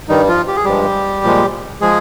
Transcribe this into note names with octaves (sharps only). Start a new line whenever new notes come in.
G2 D#3 G3 D#4
F3 F4
G4
G#4
G2 F3 G3 G#3 G4
A#2 F3 G#3
F3 G#3 G#4